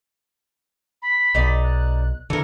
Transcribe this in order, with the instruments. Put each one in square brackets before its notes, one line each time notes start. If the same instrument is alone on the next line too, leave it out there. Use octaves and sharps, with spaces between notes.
[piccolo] B5
[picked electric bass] B1 [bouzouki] D#4 D5
[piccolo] F#6
[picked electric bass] D3 [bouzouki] E3 A#4 [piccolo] C#7